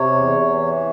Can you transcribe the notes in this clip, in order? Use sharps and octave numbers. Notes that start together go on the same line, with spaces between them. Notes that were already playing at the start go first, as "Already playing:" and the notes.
Already playing: C3 C#5
E2
E3